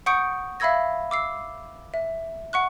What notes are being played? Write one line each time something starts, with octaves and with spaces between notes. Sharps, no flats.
F#5 C#6 D#6 G6 C#7 D7
E5 F5 B5 E6 G#6 A#6
D6 E6 C7
E5
F#5 C#6 F#6